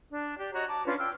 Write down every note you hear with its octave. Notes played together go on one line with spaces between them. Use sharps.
D4
G4 D5
F#4 C#5 D#5 A#5
A5 D6
C#4 D4 F4 B4
G5 C6 E6 F6